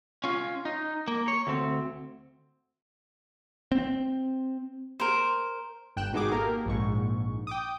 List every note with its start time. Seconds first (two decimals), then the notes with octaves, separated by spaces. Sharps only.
0.24 C#4 F4
0.65 D#4
1.08 A#3
1.28 C#5
1.47 D2 C4
3.72 C4
5.00 A#4 C5
5.96 G1 G5 F#6 E7
6.12 G#1 B2 D#4 F#4 G#4 D6
6.32 A#3 G4 A4 A#4
6.66 A#1 G#2 C#6
7.47 G5 D6 D#6